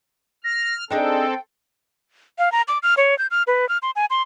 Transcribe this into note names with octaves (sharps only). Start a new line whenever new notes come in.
F6 A#6
C4 D4 D#4 G#4 A4 G5
F5
A#5
D6
F6
C#5
G6
F6
B4
F6
C6
G#5
C6